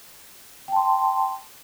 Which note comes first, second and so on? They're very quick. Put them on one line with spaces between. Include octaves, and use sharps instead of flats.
G5 A5 C6